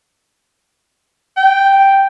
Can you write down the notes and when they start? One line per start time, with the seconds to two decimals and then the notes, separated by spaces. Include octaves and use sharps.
1.37 G5